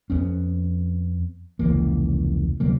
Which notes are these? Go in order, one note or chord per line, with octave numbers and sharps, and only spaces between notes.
F2 B3 C#4
F1 C#2 E3 A#3
D2 C3 F#3 A#3